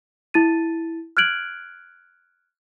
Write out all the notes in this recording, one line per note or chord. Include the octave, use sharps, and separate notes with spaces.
E4 A6 D#7
F6 F#6 G#6 D7 F#7